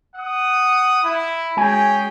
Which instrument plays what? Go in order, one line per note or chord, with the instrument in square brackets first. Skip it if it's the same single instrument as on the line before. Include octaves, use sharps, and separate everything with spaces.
[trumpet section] F#5 D#6
E4
[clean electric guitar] G#3 F#4 G#5 [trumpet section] C#4 G#4 G5